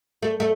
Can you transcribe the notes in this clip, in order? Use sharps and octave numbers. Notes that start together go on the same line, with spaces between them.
A3
A3